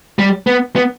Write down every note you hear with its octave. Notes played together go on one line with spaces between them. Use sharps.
G3
B3
B3